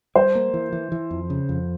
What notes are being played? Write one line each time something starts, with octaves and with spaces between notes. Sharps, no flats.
G3 C5
A#3
E3
E3
E3
F2
C#3
F2